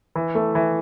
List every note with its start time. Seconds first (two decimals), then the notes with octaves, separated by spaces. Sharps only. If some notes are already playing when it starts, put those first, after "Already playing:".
0.15 E3
0.35 A3
0.55 E3